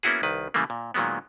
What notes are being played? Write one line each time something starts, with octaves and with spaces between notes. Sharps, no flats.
A#3 B3 C#4 E4 F#4 G#4
C2 D#3 B4
C#3 E3 G3 A3 A#3
A#2
A#2 D#3 F#3 G#3 B3